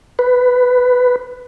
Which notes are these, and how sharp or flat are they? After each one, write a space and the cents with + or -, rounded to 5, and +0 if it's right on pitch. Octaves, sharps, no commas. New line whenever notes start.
B4 +10